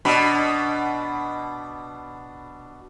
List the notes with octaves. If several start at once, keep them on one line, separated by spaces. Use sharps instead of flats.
B2 D4 B5